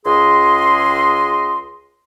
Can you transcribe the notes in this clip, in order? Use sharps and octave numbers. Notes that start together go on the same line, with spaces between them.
C#2 G#4 D#5 C6